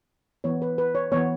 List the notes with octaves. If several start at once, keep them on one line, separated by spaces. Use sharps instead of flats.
E3 B3 C#5
B4
B4
C#5
E3 B3 C#5